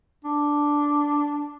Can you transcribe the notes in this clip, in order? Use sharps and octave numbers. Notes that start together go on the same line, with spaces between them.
D4